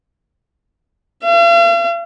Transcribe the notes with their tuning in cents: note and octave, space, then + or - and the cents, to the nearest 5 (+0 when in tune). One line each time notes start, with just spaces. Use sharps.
F5 -45